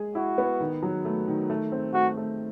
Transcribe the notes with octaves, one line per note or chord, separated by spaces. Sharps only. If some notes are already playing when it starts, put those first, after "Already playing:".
Already playing: G#3 G#4
E4 F#4
B3
D#3
F#3
A3
D#3
A3
C4
A3 F#4
A3